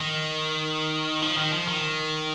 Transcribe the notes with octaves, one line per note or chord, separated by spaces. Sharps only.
D#3
F3
D#3
F3
D#3